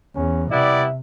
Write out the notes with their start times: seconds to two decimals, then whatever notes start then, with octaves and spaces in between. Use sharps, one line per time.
0.16 E2 C#4
0.52 C3 G3 B3 E4 D5 E5